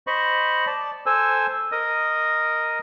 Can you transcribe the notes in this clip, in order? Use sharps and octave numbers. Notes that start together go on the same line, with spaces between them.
C5 D#5 B5 C#6
D5 A5
A4 C5 G#5 E6
A#4 D#5 D#6